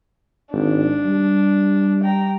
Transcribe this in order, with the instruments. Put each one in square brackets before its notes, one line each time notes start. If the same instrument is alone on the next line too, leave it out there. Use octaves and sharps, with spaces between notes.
[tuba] G#1 [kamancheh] D4
[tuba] G3
[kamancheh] G5 A#5